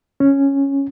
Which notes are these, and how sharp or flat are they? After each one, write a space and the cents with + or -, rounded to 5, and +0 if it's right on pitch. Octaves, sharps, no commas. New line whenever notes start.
C#4 -5